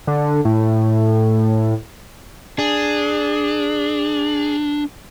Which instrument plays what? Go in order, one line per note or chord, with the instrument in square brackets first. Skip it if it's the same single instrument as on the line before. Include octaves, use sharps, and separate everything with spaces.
[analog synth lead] D3
A2
[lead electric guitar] D4 [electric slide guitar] G#4